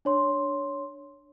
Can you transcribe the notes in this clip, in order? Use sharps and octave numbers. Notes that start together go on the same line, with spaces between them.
D4 C#5 C6